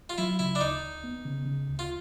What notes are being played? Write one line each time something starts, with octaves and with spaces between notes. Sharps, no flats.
F4
F#3 E4
C#3 E4
D4
D2 D#4
D2
B3
C#3
C#3
D2
F4